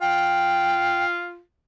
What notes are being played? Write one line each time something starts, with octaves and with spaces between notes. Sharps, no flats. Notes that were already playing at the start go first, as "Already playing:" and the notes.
F4 G5